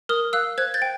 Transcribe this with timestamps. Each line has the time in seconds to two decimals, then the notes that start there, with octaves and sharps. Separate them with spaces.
0.09 A#4 D#6 F6
0.33 F5 E6 F#6
0.58 C5 F#6 G#6
0.74 G6 A6
0.82 G5